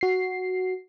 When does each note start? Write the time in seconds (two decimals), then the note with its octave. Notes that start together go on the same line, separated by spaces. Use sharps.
0.01 F#4 C7